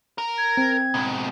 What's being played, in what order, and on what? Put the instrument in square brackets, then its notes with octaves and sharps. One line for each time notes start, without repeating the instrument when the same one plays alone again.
[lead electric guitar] A#4 A#5
[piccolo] G#6
[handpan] C4
[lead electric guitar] G#2 B2